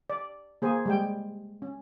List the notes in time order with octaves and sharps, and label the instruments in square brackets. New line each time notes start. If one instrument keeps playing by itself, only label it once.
[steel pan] D5
A#3 G#4 C5 G#5
G3 G#3 G5
C#4